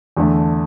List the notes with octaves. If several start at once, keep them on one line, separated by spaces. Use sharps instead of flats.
E2 D3 A3